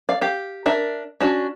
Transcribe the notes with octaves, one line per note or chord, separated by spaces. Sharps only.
D5 F5
G4 F5
D4 A#4 E5
C#4 D4 F#4